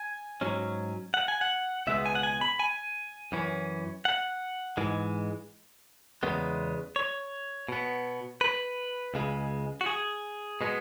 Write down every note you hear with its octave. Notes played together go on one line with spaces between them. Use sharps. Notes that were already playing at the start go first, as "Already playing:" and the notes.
Already playing: G#5
G#2 F#3 C#4
F#5
G#5
F#5
C#2 B2 G#3 B3 E5
G#5
F#5
G#5
B5
G#5
F#2 E3 C#4
F#5
G#2 E3 G#3
E2 C#3 G#3 B3
C#5
B2 B3
B4
C#2 C#3 G#3
F#4
G#4
B2 G#3 B3